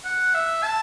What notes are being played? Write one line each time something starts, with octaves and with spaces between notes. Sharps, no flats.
F#5
E5
A5